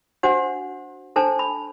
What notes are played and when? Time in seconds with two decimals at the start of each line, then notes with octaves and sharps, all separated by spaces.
0.23 D4 F#4 C5 F#5
1.16 D4 A4 C5 A5
1.39 B5